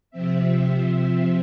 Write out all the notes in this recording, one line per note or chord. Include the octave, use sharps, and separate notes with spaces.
C3 F3 C4 E5